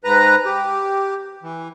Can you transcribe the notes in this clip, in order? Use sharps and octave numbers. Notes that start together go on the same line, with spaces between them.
G#2 B4 A#5
G4
E3